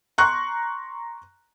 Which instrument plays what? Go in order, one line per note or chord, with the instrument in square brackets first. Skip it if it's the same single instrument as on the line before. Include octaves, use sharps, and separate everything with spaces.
[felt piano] A#5 C6 C#6 F#6